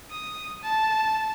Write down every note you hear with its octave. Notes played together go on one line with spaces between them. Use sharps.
D#6
A5